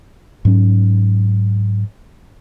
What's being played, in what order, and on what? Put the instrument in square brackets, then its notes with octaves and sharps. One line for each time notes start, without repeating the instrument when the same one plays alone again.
[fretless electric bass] G#2 F#3 C#4